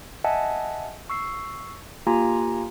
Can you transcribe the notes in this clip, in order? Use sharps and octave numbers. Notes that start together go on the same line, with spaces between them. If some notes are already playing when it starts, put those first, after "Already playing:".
D#5 E5 F#5 G#5 A5
C#6 E6 C7
A#3 F4 G4 G#5 A#5